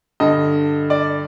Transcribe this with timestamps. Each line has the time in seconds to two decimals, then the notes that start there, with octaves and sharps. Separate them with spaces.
0.20 G2 D3 D#5
0.90 D5